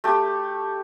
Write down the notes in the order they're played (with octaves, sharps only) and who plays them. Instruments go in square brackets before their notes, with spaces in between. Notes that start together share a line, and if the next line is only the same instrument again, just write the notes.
[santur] A3 G4